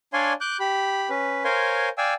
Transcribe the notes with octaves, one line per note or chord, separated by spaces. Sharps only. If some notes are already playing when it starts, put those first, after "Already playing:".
D4 C#5 D5 F5 G#5 C6
D6 F#6 G6
G4 B5
C#4 B4
A#4 C5 C#5 F5 G#5 C6
D5 F5 G5 G#5 E6